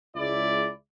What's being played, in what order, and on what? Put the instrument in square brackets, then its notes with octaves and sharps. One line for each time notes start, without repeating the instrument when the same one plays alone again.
[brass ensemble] C#2 G#3 E4 D5